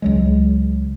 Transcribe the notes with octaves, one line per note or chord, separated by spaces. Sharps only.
C#2 F#3 G#3